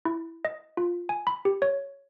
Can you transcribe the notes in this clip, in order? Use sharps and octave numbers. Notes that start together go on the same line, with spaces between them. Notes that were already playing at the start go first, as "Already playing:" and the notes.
E4
D#5
F4
G#5
B5
G4
C#5